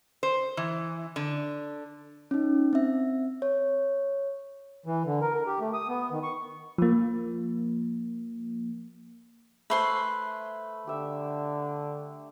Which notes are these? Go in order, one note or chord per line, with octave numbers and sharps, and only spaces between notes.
C5
E3
D3
C#4 D#4
C4 E5
C#5
E3
D3
A#4
A#4
G4
A3
D#6
B3
D#3
C#6
F3 A#3
A3 B4 C5 G#5 C6
D3 G4 E5